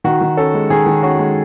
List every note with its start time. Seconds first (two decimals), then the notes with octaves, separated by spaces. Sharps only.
0.04 D#3 F#4
0.21 D#3
0.37 C#4 A4
0.54 G#3
0.70 D#3 G#4
0.86 D#3
1.03 C#4 F#4
1.19 G#3